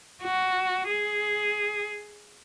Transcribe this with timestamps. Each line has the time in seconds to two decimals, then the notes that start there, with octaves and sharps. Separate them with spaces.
0.23 F#4
0.88 G#4